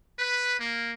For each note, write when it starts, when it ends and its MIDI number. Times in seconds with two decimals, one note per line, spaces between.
0.19 0.60 71
0.60 0.92 58